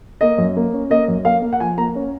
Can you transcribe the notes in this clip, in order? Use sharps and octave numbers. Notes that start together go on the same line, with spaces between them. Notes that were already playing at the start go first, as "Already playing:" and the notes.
A#3 D#5
F#2
A#3
C#4
A#3 D#5
F#2
A#3 F5
A#3
F#5
F3 G#5
A#3 A#5
C#4